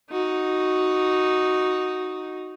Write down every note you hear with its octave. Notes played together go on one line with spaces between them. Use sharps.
D#4 F#4